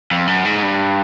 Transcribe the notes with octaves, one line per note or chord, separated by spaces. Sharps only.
F2
F#2
G#2
G2